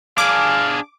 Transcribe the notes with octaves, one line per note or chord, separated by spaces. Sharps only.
D4 G#4 F5 D6